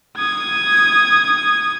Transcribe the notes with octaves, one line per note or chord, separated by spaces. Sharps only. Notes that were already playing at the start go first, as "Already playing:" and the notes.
D#6 G#6